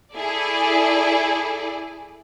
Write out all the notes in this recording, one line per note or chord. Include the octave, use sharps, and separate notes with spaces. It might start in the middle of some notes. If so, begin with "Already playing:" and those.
E4 G#4 A4 D5